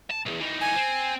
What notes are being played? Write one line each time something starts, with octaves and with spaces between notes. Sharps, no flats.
A5
B1 E2
E3 D#4
G#5
C4